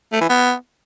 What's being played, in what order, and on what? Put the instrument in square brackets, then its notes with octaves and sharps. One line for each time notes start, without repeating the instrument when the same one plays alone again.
[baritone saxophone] A3
E3
B3